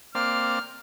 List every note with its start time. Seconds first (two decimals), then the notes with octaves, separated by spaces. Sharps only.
0.15 A#3 C4 D5 F6